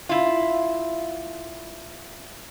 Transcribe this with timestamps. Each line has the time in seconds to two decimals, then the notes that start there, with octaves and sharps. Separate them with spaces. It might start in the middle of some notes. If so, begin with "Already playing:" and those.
0.09 E4 F4